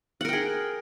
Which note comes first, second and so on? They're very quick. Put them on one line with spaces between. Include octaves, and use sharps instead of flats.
F#5 A#4 G5 G#4